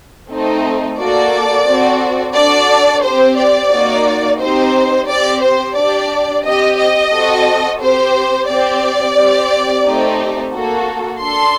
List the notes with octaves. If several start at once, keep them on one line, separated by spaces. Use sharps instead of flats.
A3 C4 D#4
A#3 F#4 A4 D5
C4 F#4 A4
D4 F#4 A4 D5
C4 G4 C5
D5
A#3 D#4 F#4
C4 D#4 G4 C5
C4 G4 D5
C5
D4 G4 D5
C4 G4 D#5
D#5
C4 F#4 A4
C4 G4 C5
C4 G4 D5
C4 G4
A3 C4 D#4 G4
A#3 F#4 A4
D4 A4 C6